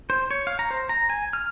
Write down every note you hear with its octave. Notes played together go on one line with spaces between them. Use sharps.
C5
C#5
F5
A#5
C5
A#5
G#5
F6